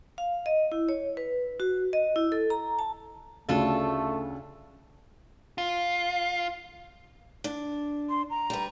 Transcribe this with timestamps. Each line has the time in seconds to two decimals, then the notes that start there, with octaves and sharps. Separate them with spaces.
0.18 F5
0.46 D#5
0.72 E4
0.89 C#5
1.17 B4
1.60 F#4
1.93 D#5
2.16 E4
2.32 A4
2.50 A#5
2.79 A5
3.49 D2 C#3 A3 D4 F4 A4
5.58 F4
7.44 D4
8.10 C6
8.30 A#5
8.50 G3 B4